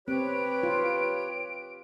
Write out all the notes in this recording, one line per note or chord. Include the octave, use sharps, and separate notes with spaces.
C4 G4 B4 C#5 D7
F4